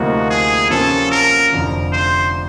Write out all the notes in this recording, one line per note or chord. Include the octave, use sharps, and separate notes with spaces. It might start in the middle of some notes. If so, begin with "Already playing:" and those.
Already playing: D2 C3 F3 A#3 D#4 F#4
G#4
C3 F3 A#3 C#4 F4 A4
A#4
F1 F2 D3 F3
C5